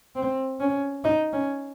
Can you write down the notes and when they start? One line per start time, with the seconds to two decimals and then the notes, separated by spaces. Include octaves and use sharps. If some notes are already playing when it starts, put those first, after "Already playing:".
0.16 C4
0.60 C#4
1.04 D#4
1.33 C#4